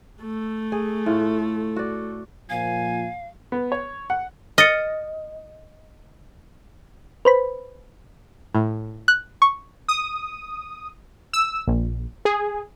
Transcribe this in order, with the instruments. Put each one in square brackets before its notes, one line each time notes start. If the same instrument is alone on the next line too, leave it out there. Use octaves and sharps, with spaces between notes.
[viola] A3
[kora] G#4
A2 F4
F#4 D5
[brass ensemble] A#2 F3 [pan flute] F5 [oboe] G#5
[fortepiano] B3
C#5
F#5
[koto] D#5 [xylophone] F6 A6 C#7
[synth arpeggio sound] B4 C5 B5
[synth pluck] A2
F#6
C#6
[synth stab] D#6
E6
A#1
G#4